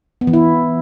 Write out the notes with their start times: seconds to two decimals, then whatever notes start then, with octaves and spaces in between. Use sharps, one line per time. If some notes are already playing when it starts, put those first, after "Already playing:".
0.21 B3
0.27 E3
0.33 E4